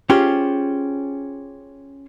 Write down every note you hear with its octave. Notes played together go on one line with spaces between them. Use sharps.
C#4 F4 G4 G#4 C5